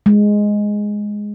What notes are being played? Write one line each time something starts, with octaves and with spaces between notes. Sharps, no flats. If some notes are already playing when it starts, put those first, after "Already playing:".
G#3